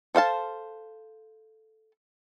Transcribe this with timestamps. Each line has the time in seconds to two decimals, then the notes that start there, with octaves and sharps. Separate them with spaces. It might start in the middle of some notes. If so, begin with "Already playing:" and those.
0.15 A4 C5 F5 A5